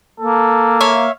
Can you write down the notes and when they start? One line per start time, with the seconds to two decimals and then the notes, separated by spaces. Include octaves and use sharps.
0.20 A#3 A4
0.81 C#5 E5 F5